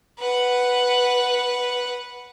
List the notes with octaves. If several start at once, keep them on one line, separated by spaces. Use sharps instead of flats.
B4 F#5